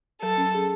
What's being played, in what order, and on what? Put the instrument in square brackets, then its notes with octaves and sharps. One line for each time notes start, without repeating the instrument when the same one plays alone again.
[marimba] F#3 [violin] A4
[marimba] C#4
G#4